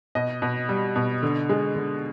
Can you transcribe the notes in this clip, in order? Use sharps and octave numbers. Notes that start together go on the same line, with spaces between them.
B2 D#5
B2
G3
B2
D3
G#3
D3